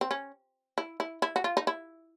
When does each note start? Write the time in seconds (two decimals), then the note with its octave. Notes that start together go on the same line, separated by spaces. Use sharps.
0.01 C4
0.11 C#4
0.78 E4
1.00 E4
1.22 E4
1.36 F#4
1.44 F4
1.57 D#4
1.67 E4